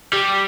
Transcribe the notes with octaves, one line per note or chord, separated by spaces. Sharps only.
G3